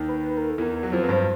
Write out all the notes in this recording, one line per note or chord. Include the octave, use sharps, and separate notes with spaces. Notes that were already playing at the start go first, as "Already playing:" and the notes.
Already playing: D#2 D#3
B4
B4
A#4
A4
E2 E3 A#4
F#3
F2 F3 C5
F#3 B4
G2 G3 C5